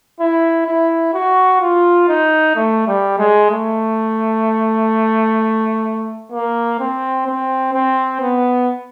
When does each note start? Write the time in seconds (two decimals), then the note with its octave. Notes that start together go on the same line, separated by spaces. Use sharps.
0.20 E4
0.67 E4
1.14 F#4
1.61 F4
2.09 D#4
2.56 A3
2.87 G3
3.18 G#3
3.51 A3
6.32 A#3
6.80 C4
7.27 C4
7.73 C4
8.21 B3